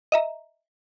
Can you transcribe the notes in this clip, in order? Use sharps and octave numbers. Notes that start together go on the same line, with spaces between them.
D#5 E5 A#5